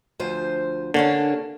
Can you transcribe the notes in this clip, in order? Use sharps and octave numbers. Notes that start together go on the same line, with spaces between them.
D2 F3 C5
D3 A#3 C#4 D4